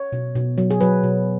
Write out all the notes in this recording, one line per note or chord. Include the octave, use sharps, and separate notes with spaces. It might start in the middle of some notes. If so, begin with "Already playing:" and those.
Already playing: C#5
B2
B2
F#3
G#4
F#3 B4
B2